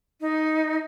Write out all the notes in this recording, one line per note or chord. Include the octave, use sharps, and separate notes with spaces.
D#4